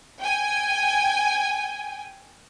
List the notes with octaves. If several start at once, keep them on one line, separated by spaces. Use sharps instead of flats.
G5 G#5